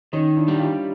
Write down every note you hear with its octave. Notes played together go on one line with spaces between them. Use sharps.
D#3 C#4 D#4
D4 E4
G3
F4 G4